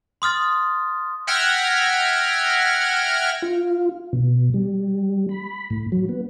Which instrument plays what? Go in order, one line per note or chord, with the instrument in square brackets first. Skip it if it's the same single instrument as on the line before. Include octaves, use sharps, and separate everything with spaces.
[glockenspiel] C6 D#6 F6 A6
[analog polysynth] E5 F#5 G5 F6 G#6 A#6
[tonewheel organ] F4
B2
G3
B5
A2
F#3
B3